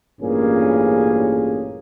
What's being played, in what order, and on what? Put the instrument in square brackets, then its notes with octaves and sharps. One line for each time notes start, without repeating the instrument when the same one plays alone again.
[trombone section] A1 G2 A#2 A#3 C#4 G#4